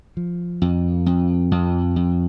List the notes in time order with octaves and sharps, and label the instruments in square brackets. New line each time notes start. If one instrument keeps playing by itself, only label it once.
[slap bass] F3
F2
F2
F2
F2